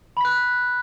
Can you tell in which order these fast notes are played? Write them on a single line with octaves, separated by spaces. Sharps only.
B5 B6 F#6